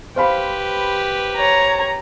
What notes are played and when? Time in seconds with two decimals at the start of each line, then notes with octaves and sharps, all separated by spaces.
0.16 G4 B4 C5 F5 B5
1.37 C#5 A#5